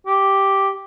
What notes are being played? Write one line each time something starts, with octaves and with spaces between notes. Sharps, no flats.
G4